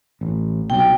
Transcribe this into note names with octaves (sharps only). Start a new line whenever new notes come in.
A1
C2 B2 F#3 G5